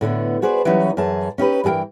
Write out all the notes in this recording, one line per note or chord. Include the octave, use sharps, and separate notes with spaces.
A2 D3 A3 B3
F#4 G#4 B4 C5 D5
E3 F#3 G3 C#4 D#4
F#2 E3 G#4 A5
C#4 D#4 G4 B4
G2 E3 G#4 A#4 G5